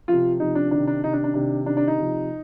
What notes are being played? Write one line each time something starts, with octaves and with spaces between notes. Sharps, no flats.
C3 F3 F4
C3 F3 D#4
D4
C3 D#3 D4
D4
C3 D#3 D#4
D4
D4
C3 D#3 D4
C3 D#3 D4
D4
D#4
C3 F3